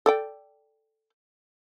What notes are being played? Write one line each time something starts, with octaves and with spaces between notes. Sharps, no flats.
A4 D5 G5